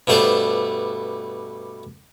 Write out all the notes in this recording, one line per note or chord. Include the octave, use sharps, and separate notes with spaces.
G2 B2 A3 C5 D5 A5